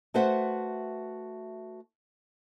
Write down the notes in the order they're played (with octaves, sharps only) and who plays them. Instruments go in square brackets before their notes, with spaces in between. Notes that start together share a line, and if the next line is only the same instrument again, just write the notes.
[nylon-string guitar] A3 F#4 B4 C5 E5 F#5